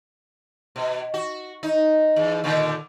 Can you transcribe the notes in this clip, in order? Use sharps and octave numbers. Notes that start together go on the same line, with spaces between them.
B2
F#4
D#4
E2
A#2 D3 D#3